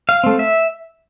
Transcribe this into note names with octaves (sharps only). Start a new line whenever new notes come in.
F5
A3 C4
E5